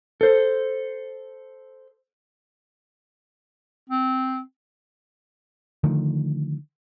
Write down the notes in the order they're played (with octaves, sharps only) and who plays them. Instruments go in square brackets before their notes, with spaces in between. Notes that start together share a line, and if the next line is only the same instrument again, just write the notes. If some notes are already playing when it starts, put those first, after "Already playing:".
[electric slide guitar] A4 C5
[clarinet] C4
[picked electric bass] D3 D#3 F3 A3